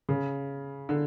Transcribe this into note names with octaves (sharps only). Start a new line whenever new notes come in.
C#3
D3